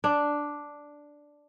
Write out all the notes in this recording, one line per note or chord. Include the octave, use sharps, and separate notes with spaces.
D4